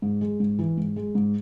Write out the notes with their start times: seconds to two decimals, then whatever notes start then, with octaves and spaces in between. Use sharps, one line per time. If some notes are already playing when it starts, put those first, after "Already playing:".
0.02 G#2
0.21 G#3
0.40 G#2
0.59 E3
0.77 G#2
0.96 G#3
1.15 G#2